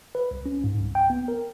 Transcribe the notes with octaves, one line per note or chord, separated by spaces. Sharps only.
B4
C2
C#4
G#2
C2
G5
B3
A#4